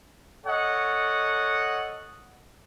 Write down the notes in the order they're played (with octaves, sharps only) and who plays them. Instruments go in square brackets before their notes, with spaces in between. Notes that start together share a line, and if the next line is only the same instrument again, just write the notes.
[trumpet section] A4 C#5 D#5 F#5